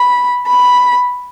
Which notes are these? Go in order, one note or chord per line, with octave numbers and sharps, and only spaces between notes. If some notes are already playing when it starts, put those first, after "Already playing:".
Already playing: B5
B5